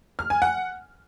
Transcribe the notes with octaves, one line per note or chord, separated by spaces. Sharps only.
F6
G#5
F#5